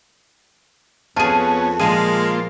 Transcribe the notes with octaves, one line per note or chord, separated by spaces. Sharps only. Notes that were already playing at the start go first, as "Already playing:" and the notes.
F2 B3 F4 G#4 C#5 A5 D#7
A#2 F3 G#3 A#3 F4 G#4